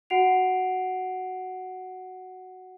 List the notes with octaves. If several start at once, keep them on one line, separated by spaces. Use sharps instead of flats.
F#4 F#5 C7 D7 F7